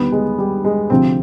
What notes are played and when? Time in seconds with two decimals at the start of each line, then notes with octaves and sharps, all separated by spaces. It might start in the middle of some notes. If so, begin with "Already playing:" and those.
Already playing: D#2 D3 G3 B3
0.12 G#3
0.38 G3
0.65 G#3
0.90 D2 C3 F3 C4